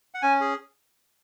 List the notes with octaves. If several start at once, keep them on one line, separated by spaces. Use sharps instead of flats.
F#5
C#4 G#5
G#4